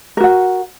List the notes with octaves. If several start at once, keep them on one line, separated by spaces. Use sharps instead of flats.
F#4 A#4 F#5